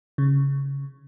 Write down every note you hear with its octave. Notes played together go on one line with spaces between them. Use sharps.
C#3